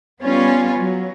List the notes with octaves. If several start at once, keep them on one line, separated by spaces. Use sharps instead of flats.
G3 B3 C#4 F4
F#3